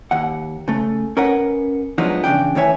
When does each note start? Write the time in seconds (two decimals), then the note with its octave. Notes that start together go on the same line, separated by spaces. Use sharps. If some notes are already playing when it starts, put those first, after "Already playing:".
0.11 D#2 F#5
0.68 C#3 A3
1.17 C#4 A#4 B4 F#5
1.98 F3 F#3 G#3 B3 D4 D#4
2.24 E2 C#3 A3 D4 G5
2.55 A2 D#3 E3 C#5 E5 G#5